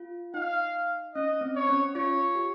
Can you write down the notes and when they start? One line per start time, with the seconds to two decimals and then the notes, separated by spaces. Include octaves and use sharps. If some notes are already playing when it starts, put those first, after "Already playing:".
Already playing: F4
0.34 D#4 F5
1.14 C#4 D#5
1.41 C4
1.55 C#5
1.69 C#4
1.95 F4 C#5
2.35 G4